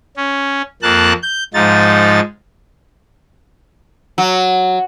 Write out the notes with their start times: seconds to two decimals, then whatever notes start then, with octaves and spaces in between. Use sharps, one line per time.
0.17 C#4
0.82 F2 A#3 A5 F#6
1.22 G6
1.54 G#2 F3 D#4 A6
4.18 F#3